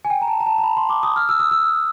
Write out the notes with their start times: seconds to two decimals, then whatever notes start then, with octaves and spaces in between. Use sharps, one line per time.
0.05 G#5
0.10 G5
0.22 A#5
0.28 A5
0.40 A#5
0.46 A5
0.58 A#5
0.63 B5
0.77 C6
0.89 D6
1.03 D#6
1.16 F6
1.29 E6
1.40 D#6
1.51 E6